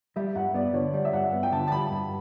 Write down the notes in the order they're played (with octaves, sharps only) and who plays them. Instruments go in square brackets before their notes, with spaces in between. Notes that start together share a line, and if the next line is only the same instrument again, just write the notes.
[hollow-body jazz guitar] G3 [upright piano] E5
[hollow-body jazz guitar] G2 [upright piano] F#5
[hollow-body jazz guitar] B3 [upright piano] D5
[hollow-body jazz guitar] D3 [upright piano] C#5
[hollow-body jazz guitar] G3 [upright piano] D5
[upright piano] E5
[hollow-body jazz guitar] G2 [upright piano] F#5
[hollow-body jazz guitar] B3
[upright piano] G5
[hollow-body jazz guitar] D3 [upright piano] A5
[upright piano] A5
[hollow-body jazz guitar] G3 [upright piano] B5
[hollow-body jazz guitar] G2